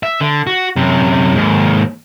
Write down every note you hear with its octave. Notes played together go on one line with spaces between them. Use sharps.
E5
D3
F#4
F#2 C3
D#2 G#2